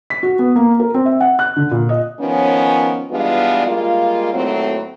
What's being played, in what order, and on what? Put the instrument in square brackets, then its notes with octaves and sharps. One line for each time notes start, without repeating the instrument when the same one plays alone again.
[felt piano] B6
F#4
B3
A#3
A#4
C4
E5
F#5
F#6
D3
A#2
D#5
[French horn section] D#3 F3 B3 C#4
E3 G3 G#3 B3 D4 F4
G3 G#3 A#3 F4
D#2 A2 F#3 A3 C4